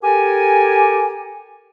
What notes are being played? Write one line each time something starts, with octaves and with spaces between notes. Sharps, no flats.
G4 A4 A#4 G#5